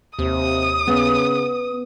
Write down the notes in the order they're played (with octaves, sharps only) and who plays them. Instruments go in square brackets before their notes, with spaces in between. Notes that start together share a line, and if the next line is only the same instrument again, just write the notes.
[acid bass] D#2 [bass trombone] C3 [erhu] D#6
[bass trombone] C#3 [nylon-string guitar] B3